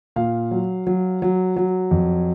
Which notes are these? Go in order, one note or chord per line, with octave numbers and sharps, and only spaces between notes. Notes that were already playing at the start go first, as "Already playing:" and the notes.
A#2 F5
F#3
F#3
F#3
F#3
F2